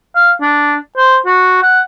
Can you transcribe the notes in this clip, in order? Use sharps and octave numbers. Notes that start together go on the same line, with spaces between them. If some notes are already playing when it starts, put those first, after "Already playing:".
F5
D4
C5
F#4
F#5